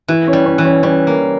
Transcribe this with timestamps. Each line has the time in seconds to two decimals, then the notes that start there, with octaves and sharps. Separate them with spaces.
0.08 E3 E4
0.27 C#4
0.33 G3
0.46 C#4
0.58 E3
0.65 C#4
0.83 G3 C#4
1.07 A#3